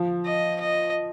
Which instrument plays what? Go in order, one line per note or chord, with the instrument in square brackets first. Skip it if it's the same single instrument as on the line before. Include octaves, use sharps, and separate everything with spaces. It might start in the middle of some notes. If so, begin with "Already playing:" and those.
Already playing: [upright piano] F3
[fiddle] D#5
D#5